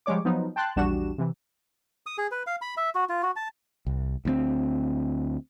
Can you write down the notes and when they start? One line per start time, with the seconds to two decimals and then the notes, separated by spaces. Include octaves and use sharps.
0.06 F3 G3 G#3 C#5 D6
0.25 F3 F#3 B3 D#4
0.56 G5 A5 C6 F#6 A6
0.76 A#1 E2 G3 D4 F#4 E7
1.18 C3 E3
2.06 D#6
2.18 G#4
2.32 B4
2.47 F5
2.62 B5
2.77 E5
2.95 F#4
3.09 F4
3.23 F#4
3.36 A5
3.87 C2
4.25 D2 G3 C4